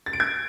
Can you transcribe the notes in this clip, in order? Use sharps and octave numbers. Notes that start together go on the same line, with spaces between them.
A6
D7
G#6